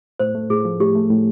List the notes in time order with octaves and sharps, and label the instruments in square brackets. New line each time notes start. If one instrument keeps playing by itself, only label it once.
[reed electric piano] A2 [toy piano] C5
[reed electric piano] A3
[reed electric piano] A2 [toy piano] G#4
[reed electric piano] F3
[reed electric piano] A2 [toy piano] G4
[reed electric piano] A3
A2